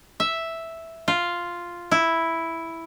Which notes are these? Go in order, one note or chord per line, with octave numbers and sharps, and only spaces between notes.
E5
F4
E4